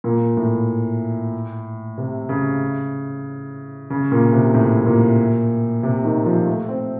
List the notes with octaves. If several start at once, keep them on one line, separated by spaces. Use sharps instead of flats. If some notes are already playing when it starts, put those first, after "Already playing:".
A#2
A2
C3
C#3
C#3
A#2
C3
A2
A#2
C3
D#3
F3
A3
C4